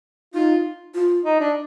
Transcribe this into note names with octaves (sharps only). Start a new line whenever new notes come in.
D#4 F4
F4
D#4
D4